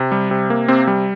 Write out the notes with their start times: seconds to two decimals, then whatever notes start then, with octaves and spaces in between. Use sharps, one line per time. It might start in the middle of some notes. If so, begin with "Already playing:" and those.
Already playing: C3
0.12 G3
0.31 C3
0.50 A#3
0.68 C3 C4
0.87 G3